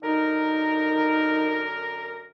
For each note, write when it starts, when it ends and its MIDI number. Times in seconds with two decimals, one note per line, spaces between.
0.03 2.29 42
0.03 2.29 50
0.03 1.66 63
0.03 2.29 70